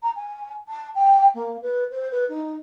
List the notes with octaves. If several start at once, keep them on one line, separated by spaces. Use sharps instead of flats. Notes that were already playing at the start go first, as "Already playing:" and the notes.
A#5
G#5
A5
G5
A#3
B4
C5
B4
D#4